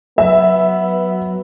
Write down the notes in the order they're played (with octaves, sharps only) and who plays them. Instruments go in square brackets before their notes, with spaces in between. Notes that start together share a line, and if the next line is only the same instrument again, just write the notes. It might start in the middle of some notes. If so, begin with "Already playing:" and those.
[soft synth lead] F#3 [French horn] B3 [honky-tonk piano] E5